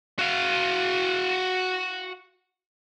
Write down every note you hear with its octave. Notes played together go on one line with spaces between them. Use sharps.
F#4 F5